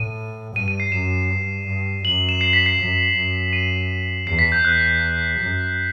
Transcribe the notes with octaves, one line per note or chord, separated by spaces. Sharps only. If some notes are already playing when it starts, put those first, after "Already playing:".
Already playing: A2 D#7
G2 D#7
D#7
C7
F#2 E7
G2
G2
F#2 F#7
E7
C7
B6
C7
F#2
F#2
D#7
E2 C7
B6
G6
E2 F#6
F#2